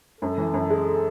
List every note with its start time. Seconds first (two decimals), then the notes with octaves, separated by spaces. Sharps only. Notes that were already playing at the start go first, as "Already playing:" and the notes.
0.21 F#2 A4
0.38 E3
0.54 F#2
0.70 G#3